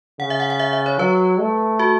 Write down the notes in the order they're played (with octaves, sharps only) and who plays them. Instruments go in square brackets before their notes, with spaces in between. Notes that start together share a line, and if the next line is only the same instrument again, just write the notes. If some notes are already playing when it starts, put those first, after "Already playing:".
[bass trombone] C#3 [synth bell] F#5
[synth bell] E5
F#5
F#5
E5
E5
C#5
[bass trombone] F#3 [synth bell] B4
[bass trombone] A3
[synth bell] F#4